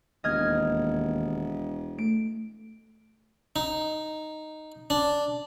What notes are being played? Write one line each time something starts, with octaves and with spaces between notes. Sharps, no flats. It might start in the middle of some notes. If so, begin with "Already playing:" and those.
E1 D#2 D#5 F6 G#6
A3 D7
D#4
D4